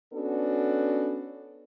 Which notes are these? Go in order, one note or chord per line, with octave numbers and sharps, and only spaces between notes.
B3 C#4 D4 F#4 A4